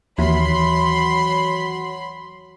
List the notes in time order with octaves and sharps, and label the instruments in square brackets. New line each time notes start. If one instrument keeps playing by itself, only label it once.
[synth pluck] D#2 [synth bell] E3 [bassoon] F#3 [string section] B5 C6